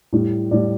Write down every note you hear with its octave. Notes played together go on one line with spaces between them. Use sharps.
A2 G3
A2 G3 D5